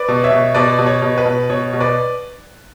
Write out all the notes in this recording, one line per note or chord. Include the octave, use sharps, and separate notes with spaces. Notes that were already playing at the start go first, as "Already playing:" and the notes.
Already playing: B4 D5
B2
C#5 E5
B2
B2 B4 D5
B2
C#5
B2
B4
B2
B2 C#5
B2
B4 D5